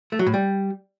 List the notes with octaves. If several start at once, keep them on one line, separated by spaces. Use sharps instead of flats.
A3
F#3
A2
G3